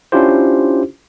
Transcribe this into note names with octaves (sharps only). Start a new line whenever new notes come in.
C#4 D4 E4 F4 G4 C5